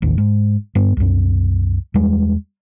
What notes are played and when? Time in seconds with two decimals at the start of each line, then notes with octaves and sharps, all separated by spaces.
0.02 A1 D#2
0.18 G#2
0.75 G2 B3
0.97 C2 F#2
1.94 E2 G3 G#3